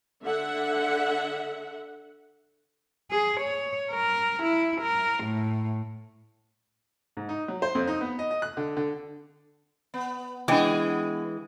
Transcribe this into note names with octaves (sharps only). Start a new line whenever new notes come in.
D3 E5 F#5
G#4
C#5
A#4
E4
A#4
A2
G#2
D#4
F#3
C5
F2
D#4
B3
D#5
D#5
F#6
D3
D3
B3
E3 G#3 B3 D4 G#4 G5 D6